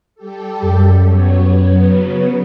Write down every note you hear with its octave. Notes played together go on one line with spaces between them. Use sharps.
G3 G4 A4
F#2
F#3 B3 C#5
C#3 F#3 B3